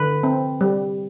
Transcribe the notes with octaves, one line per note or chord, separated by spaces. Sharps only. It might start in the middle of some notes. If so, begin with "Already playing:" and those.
Already playing: D3 B4
C4
G3